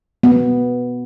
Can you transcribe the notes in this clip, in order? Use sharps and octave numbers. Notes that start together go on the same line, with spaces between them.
B3